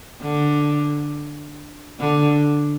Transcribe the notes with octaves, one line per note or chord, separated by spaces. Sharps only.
D3
D3